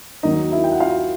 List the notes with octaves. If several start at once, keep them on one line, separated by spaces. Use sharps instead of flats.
D#2 D#3 F#3 D#4 D#5
E4 E5
G5
F#5
F4 F5